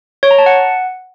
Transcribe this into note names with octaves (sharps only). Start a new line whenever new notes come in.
C#5
A#5
A5
F#5